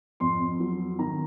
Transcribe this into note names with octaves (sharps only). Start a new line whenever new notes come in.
F2 C6
F#3
D#3 A#5